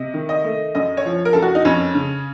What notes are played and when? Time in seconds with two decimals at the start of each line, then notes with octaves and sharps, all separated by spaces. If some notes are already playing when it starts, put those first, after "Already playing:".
Already playing: C3 D#5
0.14 D#3
0.29 D#5
0.44 A3
0.75 F#2 D#5
0.97 C#5
1.05 F3
1.25 A#4
1.33 F#2 A4
1.42 F#4
1.55 D#4
1.65 F2 C#4
1.95 C#3